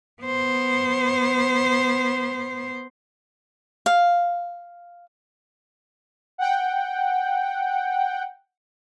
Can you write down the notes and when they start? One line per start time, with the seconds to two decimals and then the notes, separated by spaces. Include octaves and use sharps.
0.23 B3 C5
3.86 F5
6.38 F#5 G5